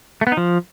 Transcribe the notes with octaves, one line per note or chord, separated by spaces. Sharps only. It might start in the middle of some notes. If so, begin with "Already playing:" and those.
A3
B3
D#4
F3